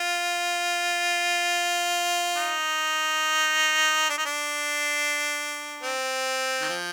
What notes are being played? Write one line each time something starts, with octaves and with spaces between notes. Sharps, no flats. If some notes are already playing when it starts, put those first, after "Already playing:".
Already playing: F4
D#4
D4
D#4
D4
C4
D#3
F3